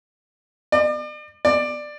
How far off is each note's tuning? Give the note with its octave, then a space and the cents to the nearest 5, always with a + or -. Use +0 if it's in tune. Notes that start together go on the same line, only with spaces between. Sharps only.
D5 +40
D5 +15